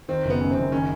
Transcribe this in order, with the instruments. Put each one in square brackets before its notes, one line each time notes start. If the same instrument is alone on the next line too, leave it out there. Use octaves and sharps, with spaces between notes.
[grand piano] D#3 [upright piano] C4
[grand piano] F#1
[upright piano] B3
[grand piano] F#2
[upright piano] C4
[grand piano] F#1
[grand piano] D#3 [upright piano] C#4